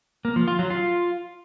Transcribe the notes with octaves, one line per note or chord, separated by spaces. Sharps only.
A#3
F3
F4
F#3
F4